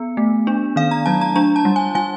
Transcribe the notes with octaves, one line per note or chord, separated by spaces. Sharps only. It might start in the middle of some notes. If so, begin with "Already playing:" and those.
Already playing: B3
A3
D4
D#3 F5
A#5
F#3 A5
A#5
D4 A#5
A5
G3
G#5
G3 G#5